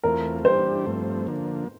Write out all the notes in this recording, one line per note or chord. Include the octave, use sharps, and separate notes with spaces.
E2 E3 A3 C4 F4 A#4
E3 G3 D4 G4 C5
G2 F3 A3 C4
D3 F3 A#3